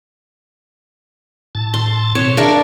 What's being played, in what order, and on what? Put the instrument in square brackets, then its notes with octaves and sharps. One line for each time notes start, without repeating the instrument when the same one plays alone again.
[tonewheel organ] A2 A5
[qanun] C6
[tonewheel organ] B2 C4 [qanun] C#5
[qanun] D4 A#4 [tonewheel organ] G#4 E5 F5